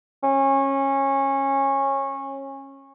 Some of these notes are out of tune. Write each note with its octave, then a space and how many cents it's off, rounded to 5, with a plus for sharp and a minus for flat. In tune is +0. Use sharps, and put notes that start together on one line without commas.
C#4 -20